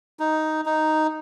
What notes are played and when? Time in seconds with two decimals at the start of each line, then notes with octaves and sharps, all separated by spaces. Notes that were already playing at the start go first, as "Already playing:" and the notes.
0.19 D#4
0.65 D#4